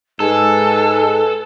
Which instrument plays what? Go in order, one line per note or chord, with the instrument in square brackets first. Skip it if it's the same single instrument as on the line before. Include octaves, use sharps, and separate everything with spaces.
[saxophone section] G#2 G#4 [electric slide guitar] A4 [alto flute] B4